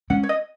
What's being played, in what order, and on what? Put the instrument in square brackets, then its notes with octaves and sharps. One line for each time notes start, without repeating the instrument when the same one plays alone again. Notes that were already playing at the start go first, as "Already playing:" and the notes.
[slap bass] G#3 C#4 [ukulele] F#5
[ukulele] C#5
D#5